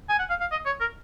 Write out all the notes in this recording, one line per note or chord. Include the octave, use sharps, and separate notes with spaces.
G#5
F#5
F5
F5
D#5
C#5
A#4